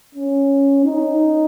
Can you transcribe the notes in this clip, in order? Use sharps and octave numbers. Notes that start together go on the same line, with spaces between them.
C#4
D#4